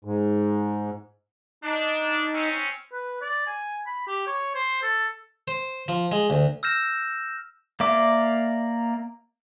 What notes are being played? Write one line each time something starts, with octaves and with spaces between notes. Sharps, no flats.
G#2
D4 D#4
C4 C#4
B4
D5
G#5
B5
G4
C#5
C5
A4
C5
F3
G#3
D2
E6 F6 G6 A#6 E7
A#3 D5 E5 D6